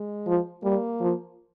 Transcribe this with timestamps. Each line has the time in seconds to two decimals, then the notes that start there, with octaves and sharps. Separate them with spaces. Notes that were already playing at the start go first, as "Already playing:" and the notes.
Already playing: G#3
0.27 F3
0.63 G3 A#3
1.00 F3